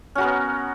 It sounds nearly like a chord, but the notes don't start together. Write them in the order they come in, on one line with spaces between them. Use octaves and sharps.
C#4 F#4 A#4 B3